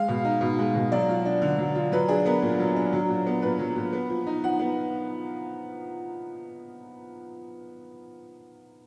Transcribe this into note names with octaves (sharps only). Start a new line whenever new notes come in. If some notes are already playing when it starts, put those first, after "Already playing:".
Already playing: G#3 F5
B2
D#4
B2
G#3
B2
F#3 D5
F4
D4
D3
F#3
F4
F#3 B4
D4 G#4
B3 A#4
A#2
F#3
D4
F#3
A#2
B3
A#2 B4
F#3
A#2
B3
F3
D#4
F3 F#5
B3